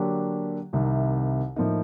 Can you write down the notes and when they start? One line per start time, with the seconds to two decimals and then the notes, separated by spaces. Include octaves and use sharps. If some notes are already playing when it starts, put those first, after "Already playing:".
Already playing: D3 F#3 A#3 D4 G4
0.73 C2 C3 D#3
1.56 A2 F3 A#3 D#4